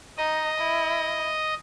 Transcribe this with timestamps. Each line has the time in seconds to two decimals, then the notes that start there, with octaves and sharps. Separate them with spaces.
0.17 D#4 D#5
0.58 E4